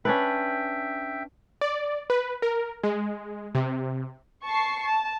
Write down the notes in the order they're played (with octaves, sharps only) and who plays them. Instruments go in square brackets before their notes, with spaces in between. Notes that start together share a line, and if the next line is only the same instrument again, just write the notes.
[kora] C#4 D4 B4 [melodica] E5 G5
[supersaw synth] D5
B4
A#4
G#3
C3
[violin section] A5 C#6 C7
A5